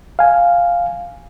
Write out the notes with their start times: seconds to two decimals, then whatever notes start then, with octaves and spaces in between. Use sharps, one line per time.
0.19 F5 G#5